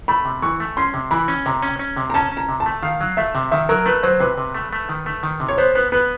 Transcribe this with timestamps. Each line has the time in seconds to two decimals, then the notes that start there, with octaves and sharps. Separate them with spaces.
0.08 A3 B5
0.25 C3
0.42 E3 C#6
0.60 A3
0.77 C#4 C6
0.94 C3
1.11 E3 B5
1.28 C#4
1.46 C3 A#5
1.62 C#4
1.79 C#4
1.97 C3
2.10 A#5
2.14 C#4 A5
2.32 C#4
2.37 A#5
2.49 C3
2.60 A5
2.66 A3
2.83 D#3 F5
3.01 F#3
3.17 A3 E5
3.35 C3
3.52 D#3 E5
3.69 F#3 A#4
3.86 A3 B4
4.03 F#3 C5
4.20 C3 B4
4.38 C3
4.55 A3
4.73 A3
4.89 D#3
5.06 A3
5.23 D#3
5.40 C3
5.49 C#5
5.58 B3 C5
5.75 B3 B4
5.92 B3 B4